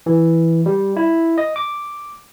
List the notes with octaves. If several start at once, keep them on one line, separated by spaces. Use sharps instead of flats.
E3
G3
E4
D#5
D6